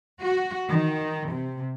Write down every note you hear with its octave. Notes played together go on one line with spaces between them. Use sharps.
F#4
D#3
C3